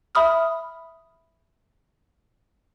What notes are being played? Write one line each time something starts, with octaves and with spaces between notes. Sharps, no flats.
E5 B5 D#6 F6